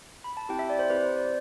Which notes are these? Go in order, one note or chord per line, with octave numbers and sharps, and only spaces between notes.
B5
A5
C4 E4 G4 G5
E5
D5
C5
C4 E4 G4 B4
C5
D5